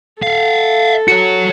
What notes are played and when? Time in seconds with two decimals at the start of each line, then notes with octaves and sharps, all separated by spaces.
0.22 A4 E5 F5
1.08 F#4 C#5 C#7